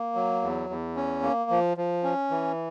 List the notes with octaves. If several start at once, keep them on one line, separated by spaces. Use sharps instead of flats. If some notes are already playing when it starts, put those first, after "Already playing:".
Already playing: A#3
F#3
E2
E2
C#4
A#3
F3
F3
C#4
E3